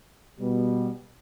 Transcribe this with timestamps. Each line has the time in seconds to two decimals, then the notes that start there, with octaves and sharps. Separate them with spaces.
0.38 B2 G3 B3